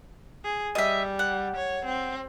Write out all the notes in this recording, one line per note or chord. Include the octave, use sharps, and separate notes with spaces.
G#4
G3 D#5 E5
F#5
C#5
C4